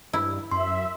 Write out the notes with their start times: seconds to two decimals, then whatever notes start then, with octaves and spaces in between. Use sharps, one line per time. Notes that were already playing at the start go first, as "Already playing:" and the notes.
0.13 G2 E4
0.51 F#2 E5 C6